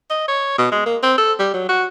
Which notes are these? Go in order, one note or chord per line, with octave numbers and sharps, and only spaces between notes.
D#5
C#5
B2
G#3
A#3
C4
A4
G3
F#3
F#4